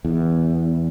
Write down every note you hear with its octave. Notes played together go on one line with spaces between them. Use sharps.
E2